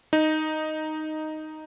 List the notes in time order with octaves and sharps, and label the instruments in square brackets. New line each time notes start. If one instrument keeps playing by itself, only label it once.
[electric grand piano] D#4